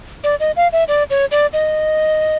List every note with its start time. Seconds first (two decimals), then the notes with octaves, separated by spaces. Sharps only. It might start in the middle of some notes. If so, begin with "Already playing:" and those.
0.24 D5
0.40 D#5
0.56 F5
0.73 E5
0.88 D5
1.10 C#5
1.31 D5
1.53 D#5